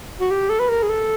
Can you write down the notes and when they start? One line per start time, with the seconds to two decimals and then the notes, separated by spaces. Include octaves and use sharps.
0.20 F#4
0.31 G4
0.50 A4
0.59 B4
0.69 A#4
0.82 G#4
0.89 A4